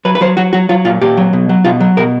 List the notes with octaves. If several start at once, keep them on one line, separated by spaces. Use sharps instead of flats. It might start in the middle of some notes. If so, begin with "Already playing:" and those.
F#3 B4
B4
F#3 C5
F#3 F#4
F#3 F#4
F#3 F4
A#2 F4
A#2 G4
F#3
B2
F#3
B2 F4
F#3
B2 A#4